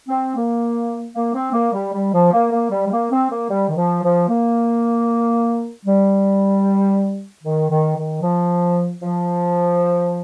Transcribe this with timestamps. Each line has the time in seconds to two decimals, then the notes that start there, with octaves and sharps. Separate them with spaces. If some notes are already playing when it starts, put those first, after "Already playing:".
0.08 C4
0.35 A#3
1.14 A#3
1.33 C4
1.52 A#3
1.73 G3
1.93 G3
2.12 F3
2.32 A#3
2.51 A#3
2.70 G3
2.86 G3
2.91 A#3
3.11 C4
3.29 A#3
3.49 G3
3.68 D#3
3.75 F3
4.02 F3
4.28 A#3
5.86 G3
7.43 D#3
7.69 D#3
7.96 D#3
8.21 F3
9.01 F3